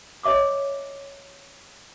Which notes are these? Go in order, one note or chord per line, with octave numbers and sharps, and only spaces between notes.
C#5 D#5 E5 D6 D#6